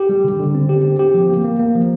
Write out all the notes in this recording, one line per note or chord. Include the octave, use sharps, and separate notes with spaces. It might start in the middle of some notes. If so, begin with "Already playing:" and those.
Already playing: G4
G3
D3
D3
C4
G4
C4
G4
F3
A#3
A#3
A#3
F3